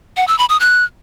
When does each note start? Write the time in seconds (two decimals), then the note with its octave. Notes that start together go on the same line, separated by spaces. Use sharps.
0.17 F#5
0.28 E6
0.38 B5
0.49 D#6
0.60 F#6